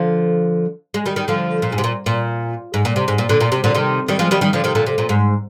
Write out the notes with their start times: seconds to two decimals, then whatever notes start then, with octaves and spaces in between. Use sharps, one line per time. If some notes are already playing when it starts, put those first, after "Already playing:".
Already playing: D3 F3
0.94 G#3
1.06 D#3 G3
1.16 D#3 G3
1.28 D3 F3
1.62 A#2
1.72 G#2
1.78 C3
1.84 A#2
2.06 A#2
2.74 G#2
2.85 A#2
2.96 C3
3.08 G#2
3.18 A#2
3.29 A#2 D3
3.41 A#2
3.52 C3
3.64 A#2 D3
3.75 C3 D#3
4.08 D#3 G3
4.19 F3 G#3
4.31 D#3 G3
4.41 D#3 G3
4.53 D3 F3
4.64 C3 D#3
4.75 A#2 D3
4.86 C3
4.98 A#2
5.09 G#2